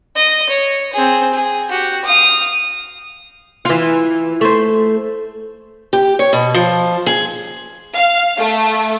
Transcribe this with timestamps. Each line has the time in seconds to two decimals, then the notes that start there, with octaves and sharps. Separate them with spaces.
0.16 D#5
0.49 C#5
0.93 C4 G#4
1.33 G#4
1.70 F#4 G4
2.05 F5 D#6
3.65 E3 F4
4.41 A3 C5
5.93 G4
6.19 C#5
6.33 B2
6.55 F3
7.06 G#4
7.96 F5
8.39 A3